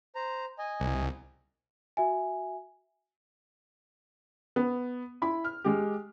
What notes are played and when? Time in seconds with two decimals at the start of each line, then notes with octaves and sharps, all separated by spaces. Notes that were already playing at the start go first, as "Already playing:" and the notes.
0.15 C5 A#5
0.59 D#5 G#5
0.80 C2
1.97 F#4 E5 G#5
4.56 B3
5.22 E4 B5
5.44 F6
5.64 G#3 G4